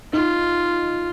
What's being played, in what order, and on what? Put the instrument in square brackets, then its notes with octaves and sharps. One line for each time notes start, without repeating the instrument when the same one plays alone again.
[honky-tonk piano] D#4 [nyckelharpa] F4